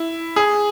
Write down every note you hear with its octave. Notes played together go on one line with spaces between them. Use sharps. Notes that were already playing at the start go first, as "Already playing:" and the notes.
Already playing: E4
G#4